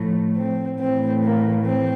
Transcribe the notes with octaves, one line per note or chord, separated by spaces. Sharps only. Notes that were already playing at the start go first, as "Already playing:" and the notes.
Already playing: A2 F3 A3
C4
A2 E3 A3 C4
A#3
C4